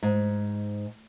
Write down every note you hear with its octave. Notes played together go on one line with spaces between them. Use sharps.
G#2